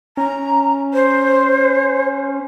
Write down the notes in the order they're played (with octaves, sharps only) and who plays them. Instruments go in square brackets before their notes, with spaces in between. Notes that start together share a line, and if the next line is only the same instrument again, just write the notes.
[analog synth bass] C#4 [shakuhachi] A#5
[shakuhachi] C5